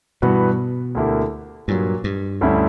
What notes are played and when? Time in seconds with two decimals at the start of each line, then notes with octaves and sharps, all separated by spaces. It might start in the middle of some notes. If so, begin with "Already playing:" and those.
0.22 G2 B2 E3 B3 F#4 B4
0.95 D2 D3 A#3 E4 G4
1.68 G2 A#2 F#3 A#3
2.04 G2
2.41 D2 D3 G3 C#4 E4